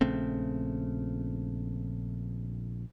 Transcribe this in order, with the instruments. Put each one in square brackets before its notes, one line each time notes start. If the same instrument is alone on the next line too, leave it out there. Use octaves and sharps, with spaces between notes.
[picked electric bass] A#1 C#3 A3 C4